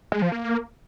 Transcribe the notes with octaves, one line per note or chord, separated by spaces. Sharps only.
G#3
F3
A#3